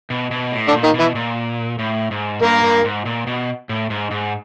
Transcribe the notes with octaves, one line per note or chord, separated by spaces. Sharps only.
B2
B2
A2
D3 D4
A#2
D#3 D#4
B2
E3 E4
A#2
A2
G#2
G2 A#3 A#4
G2
G#2
A#2
B2
A2
G#2
G#2